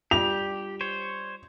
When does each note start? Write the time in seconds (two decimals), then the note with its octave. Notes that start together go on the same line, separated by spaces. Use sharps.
0.11 G3 D4 F4 G4 F7
0.81 C5 C#5